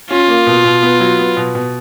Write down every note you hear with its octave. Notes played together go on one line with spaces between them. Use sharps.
C#4 F4
A#3
B2
B2
B3
F#3
B3
B2
B2